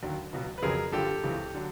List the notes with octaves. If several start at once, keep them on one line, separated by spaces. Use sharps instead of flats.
D#2 D3 F#3
C#2 B2 F#3
B4
F2 C#3 F#3 G#4 A#4
G2 D3 F3 G4 A4
C#2 C3 E3
D3 F#3